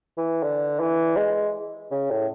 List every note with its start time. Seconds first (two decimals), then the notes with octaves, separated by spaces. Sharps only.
0.17 E3
0.43 D3
0.80 E3
1.17 G#3
1.91 C#3
2.11 A2